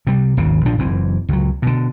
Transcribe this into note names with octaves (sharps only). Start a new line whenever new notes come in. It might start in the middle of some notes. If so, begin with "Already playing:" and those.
C3 G3
G#1 D#2 C#3
A#1 A#2 F3 D4
F#1 E3 C4
C#2 F#3
B2 D3